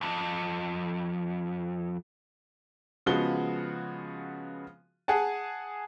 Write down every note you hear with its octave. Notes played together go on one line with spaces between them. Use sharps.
B1 F2
C#3 F3 G#3 B3 F#4 G7
G#4 F#5 G#5 A5